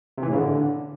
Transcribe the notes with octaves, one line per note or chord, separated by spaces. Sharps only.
C3
E3
A2
C#3
D3